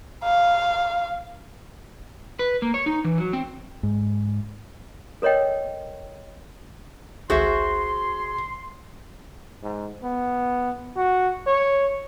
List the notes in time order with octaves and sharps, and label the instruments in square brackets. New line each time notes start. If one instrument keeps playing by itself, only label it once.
[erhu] F5
[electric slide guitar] B4
A#3
C#5
D#4
E3
F#3
C4
[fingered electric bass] G#2
[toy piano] A4 A#4 C#5 D#5 G5
[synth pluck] G#1 C#2 A4 [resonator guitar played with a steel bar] F#4 C5 E5 [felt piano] G#4 [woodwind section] C6
[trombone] G#2
B3
F#4
C#5